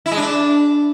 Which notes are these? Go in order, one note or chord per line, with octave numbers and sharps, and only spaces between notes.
E4
G#3
D4